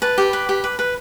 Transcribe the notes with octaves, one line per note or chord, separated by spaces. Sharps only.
B4 A5
G4
B4
G4
B4
B4